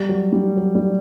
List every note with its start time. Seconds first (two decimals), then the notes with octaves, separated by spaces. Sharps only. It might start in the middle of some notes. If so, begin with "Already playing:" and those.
Already playing: G3
0.09 F#3
0.32 G3
0.57 F#3
0.75 G3